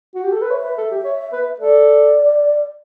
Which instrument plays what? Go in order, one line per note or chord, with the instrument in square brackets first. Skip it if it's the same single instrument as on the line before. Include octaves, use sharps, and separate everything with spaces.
[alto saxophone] F#4
G4
A4
B4
[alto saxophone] C#5 [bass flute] E5
[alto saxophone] B4
A4
G4
C#5
B4
[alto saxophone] A4 [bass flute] D5